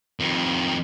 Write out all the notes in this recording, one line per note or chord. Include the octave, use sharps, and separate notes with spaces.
F2 D#3